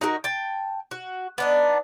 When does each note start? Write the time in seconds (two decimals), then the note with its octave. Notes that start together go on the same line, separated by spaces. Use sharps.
0.01 D#4 F#4 G4 A#4
0.24 G5 A5
0.91 F#4
1.38 B3 D4 D#4